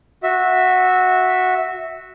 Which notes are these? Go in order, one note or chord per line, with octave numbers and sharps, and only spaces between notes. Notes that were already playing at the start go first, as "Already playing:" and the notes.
F#4 E5